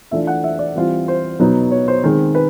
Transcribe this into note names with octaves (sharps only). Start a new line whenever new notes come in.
E3 A3 D4 F4 E5
F#5
E5
D5
E3 G3 C4 F4
C5
B2 F#3 B3 D#4
C#5
C5
D#3 G#3 C4
B4